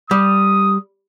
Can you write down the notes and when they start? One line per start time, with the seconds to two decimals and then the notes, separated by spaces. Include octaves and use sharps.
0.11 G3 D#6